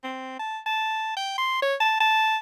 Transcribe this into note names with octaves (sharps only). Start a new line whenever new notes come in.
C4
A5
A5
G5
C6
C#5
A5
A5